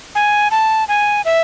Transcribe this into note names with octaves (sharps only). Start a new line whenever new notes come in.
G#5
A5
G#5
E5